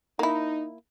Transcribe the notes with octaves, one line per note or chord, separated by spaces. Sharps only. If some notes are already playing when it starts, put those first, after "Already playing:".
A#3 D#4 E4